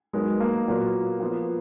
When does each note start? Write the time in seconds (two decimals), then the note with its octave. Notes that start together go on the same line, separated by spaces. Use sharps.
0.13 F#3 G#3 B3 D#4 A#4
0.40 A#3
0.68 A#2 F#3 B3 F#4 A#4
1.20 F3 B3 F4